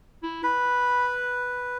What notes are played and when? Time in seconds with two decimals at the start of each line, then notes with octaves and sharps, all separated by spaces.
0.23 E4
0.44 B4 B5